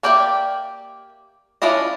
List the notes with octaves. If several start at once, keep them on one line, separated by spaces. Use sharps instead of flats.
A#3 G4 D5 E5 G5
C#4 D4 E4 F4 D#5